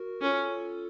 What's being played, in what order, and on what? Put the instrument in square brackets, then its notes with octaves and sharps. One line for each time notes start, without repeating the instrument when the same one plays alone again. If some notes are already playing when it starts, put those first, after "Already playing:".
Already playing: [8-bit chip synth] F#4 A#4
[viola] C#4 [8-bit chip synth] F4 A4